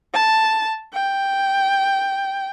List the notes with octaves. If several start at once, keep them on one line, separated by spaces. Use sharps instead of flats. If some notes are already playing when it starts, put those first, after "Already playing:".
A5
G5